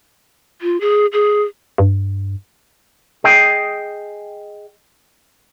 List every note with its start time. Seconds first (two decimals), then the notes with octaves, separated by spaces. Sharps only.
0.62 F4
0.81 G#4
1.13 G#4
1.78 G2
3.24 G#4 D#5 G5